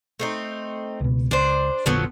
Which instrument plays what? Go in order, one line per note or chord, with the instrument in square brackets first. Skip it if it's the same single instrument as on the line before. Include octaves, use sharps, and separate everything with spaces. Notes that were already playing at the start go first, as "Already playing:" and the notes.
[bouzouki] A3 C4 D#4
[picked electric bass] C#2 B2
[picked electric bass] C#2 [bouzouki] D4 C5
[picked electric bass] F1 A#1 D3 [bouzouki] F3 F#3 B3